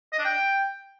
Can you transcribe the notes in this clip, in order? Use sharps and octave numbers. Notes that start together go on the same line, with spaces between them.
D#5
D4
G5